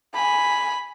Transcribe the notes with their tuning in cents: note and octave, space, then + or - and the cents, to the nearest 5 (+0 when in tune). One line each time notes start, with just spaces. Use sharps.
G#5 +0 B5 +0